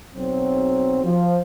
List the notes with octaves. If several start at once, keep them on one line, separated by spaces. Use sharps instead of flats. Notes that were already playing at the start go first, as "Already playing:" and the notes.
B1 F#3 C4
F3